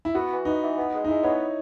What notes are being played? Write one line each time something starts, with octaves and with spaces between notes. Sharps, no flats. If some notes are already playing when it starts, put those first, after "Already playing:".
E4
B3 F#4
E3
B3 D#4
E3
B3
G#3
D#4
G#3 E4
B3 C#5